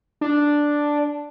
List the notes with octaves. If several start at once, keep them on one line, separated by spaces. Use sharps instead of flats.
D4